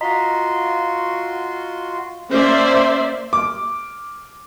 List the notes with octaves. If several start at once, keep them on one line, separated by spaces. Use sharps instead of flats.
F4 F#4 D#5 A#5 C6 B6
A#3 C#4 C5 D5 E5
D6